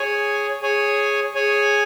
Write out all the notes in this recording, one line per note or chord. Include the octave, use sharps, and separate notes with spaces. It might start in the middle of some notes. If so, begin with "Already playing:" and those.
Already playing: G#4 C#5 G#5
G#4 C#5 G#5
G#4 C#5 G#5